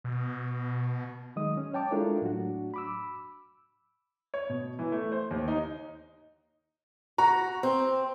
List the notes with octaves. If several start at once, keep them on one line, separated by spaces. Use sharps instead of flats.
B2
D#3 F#3 G#3 D#5 D#6
C#4
C#5 G5 A5 D6
G#3 D4 E4 F4 A4 A#4
A2 F#3 D4 F#4
B5 D6 E6
C#5
B2
E3
A3
C5
D#2
D#4
F#4 A#5
C4